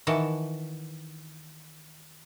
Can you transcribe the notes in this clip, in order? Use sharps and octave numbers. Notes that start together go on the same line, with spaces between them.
D#3 E3 F#4 A5